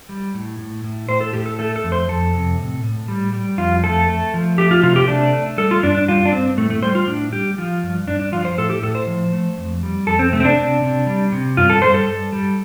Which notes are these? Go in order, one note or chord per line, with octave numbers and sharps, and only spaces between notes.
G3
A2
A2
A2
A2 C5
A4
A2 G4
A4
A3 A4
A4
F2
C5
F2 A4
C3
A2
A2
G3
G3
F2 F4
A3 A4
A3
F3
A3 G4
F4
C3 F4
G4
A3 D4
A3
G3 A4
F4
G2 D4
D4
G3 F4
D4
G2 C4
A2 A3
A3
G3 C5
F4
A2 D4
G3 G4
F3 F4
G2
G2 D4
D4
F3 F4
C5
A2 A4
G4
A2 A4
C5
F3
A3
F2
G3
F2 A4
C4
C3 A3
C4
D4
C3
C3
G3
C3
G2 F4
A4
G3 C5
A4
G2
G3